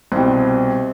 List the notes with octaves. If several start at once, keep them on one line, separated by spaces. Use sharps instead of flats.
C2 B2 G3 C4